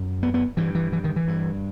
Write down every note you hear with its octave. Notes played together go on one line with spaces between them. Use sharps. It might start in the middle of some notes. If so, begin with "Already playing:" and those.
Already playing: F#2
B3
B3
G2 E3
E3
E3
D#3
E3
G2